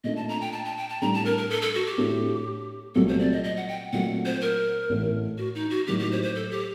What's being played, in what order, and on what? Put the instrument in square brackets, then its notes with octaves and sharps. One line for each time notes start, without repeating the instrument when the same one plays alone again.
[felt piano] A#2 A3 D4 [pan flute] D#5
[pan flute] A5
A#5
G5
A5
A5
G5
A5
[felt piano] A2 G3 D4 A4 [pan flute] A#5
[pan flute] A5
A#4
A#4
A4
A4
F#4
G4
[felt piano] A2 A3 D4 F#4 A4
[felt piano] C2 A#2 F#3 A3 C4 [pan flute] A4
[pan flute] C5
D5
D#5
D#5
F#5
G5
[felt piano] A#2 F#3 A3 C4 [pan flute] F#5
[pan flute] C5
A#4
[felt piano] A1 A2 A3
[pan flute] F#4
D#4
F#4
[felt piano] A2 F#3 A#3 D#4 F#4 [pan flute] G4
[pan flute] G4
C5
C5
A4
G4